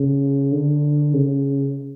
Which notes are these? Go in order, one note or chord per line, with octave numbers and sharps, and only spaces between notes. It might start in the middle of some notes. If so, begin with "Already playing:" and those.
Already playing: C#3
D3
C#3